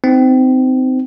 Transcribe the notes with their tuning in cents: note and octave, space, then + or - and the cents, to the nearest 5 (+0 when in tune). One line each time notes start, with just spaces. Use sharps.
C4 -25 D#4 +0